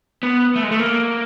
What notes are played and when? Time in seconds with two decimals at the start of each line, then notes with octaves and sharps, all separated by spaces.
0.23 B3
0.56 A3
0.64 G#3
0.71 A3
0.80 A#3